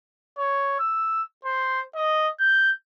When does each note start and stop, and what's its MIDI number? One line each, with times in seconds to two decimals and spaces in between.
0.38 0.75 73
0.79 1.22 88
1.45 1.81 72
1.95 2.28 75
2.40 2.71 91